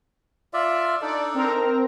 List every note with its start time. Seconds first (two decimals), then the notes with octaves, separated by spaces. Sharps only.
0.53 F4 D5 E5
1.02 D4 D#4 A4 D5
1.34 C4 A#4 A#5